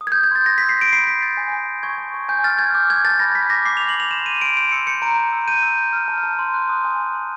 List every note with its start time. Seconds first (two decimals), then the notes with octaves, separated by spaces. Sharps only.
0.01 D#6
0.07 G#6
0.12 D#6 G6
0.24 G#6
0.31 C6 A6
0.46 G6 A#6
0.58 E6 B6
0.69 C7
0.77 E6 D7
0.92 B5 C7
1.07 G6 B6
1.22 G6 A6
1.37 G#5
1.53 G#5
1.68 G#5
1.83 C#6 G#6
1.98 A5
2.14 C#6
2.29 G#5 G6
2.44 F6 A6
2.59 F6 G#6
2.74 D6 G6
2.90 D6 G#6
3.05 A5 A6
3.19 B5 A#6
3.35 B5 B6
3.50 D6 A#6
3.65 D6 C7
3.77 D6 F7
3.89 F#7
3.96 D6 F7
4.11 C6 E7
4.26 G6 D#7
4.41 C6 D7
4.57 G6 D7
4.72 E6 C#7
4.87 G6 C#7
5.02 A#5 D7
5.18 A#5
5.32 E6
5.48 G6 D#7
5.63 E6
5.78 G6
5.93 F6
6.08 A5
6.24 A5
6.39 C6
6.54 F#6
6.69 D#6
6.85 G#5
7.00 C6
7.15 C6